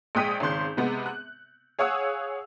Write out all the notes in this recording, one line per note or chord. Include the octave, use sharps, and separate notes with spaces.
A#1 G#3 G5 D#6 B6 D#7
G#1 C#3 C6 G6
C3 G#3 B3
F#6
G#4 C#5 F5 F#5 D#6 E6